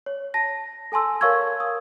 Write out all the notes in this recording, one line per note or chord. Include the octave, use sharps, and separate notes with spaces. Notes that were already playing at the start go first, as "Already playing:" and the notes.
C#5
A5 A#6
A4 G#5 A5 C6 E6
A#4 C#5 F5 C#6 E6 G#6
D#6